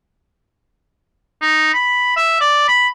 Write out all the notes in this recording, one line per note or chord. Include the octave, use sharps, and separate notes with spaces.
D#4
B5
E5
D5
B5